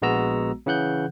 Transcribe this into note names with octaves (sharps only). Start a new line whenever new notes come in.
A#1 G#3 B3 F#4 A#5 E6
C#3 E3 F#5 F#6 G6